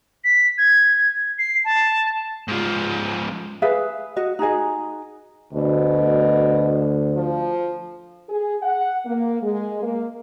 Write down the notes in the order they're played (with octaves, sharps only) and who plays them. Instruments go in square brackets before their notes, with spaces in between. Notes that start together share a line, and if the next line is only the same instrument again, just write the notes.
[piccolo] B6
G#6
C7
A5
[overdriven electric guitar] G#2 F3
[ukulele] G#4 B4 E5 F5
F#4 D#5
D#4 F#4 G#4 D#5
[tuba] D2 [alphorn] B2
[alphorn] F3
[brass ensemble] G#4
F#5
A#3
G#3
A#3